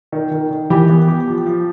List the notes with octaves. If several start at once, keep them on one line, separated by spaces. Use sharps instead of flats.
D#3
D#3
D#3
E3 G4
B3
G4
F3
F3